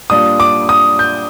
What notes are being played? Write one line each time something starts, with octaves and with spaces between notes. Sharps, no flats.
A#2 G3 D4 F4 D#6
D6
D#6
G6